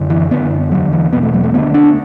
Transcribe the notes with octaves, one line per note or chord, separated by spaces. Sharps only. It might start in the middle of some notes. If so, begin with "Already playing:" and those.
Already playing: F#2 D3
E3
F#2 D3 B3
E2 D3 F#3
E3
E2 B2 B3
A3
F#3
A3
D2 D3 B3
D4